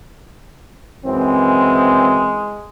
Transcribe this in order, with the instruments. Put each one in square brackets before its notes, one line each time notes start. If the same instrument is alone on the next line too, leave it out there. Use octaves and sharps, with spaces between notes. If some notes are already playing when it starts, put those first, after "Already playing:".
[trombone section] F#2 E3 C4 [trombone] G#3